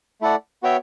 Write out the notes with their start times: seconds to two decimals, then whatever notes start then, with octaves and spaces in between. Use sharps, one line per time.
0.21 A3 E4 A4 D5 F#5
0.63 B3 F#4 C#5 E5 G5